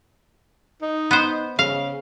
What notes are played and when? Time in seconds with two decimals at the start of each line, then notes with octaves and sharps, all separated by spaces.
0.82 D#4
1.11 B3 C5
1.59 C#3 F5